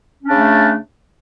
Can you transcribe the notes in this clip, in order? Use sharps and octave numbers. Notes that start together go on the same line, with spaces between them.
C#3 A3 C#4 D4